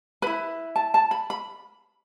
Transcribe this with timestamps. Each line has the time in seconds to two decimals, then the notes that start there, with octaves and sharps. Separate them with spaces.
0.22 E4 B4 B5
0.76 A5
0.94 A5
1.11 B5
1.30 B5